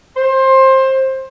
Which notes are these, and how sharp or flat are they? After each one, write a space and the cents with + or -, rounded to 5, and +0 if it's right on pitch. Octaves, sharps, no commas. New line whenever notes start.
C5 +20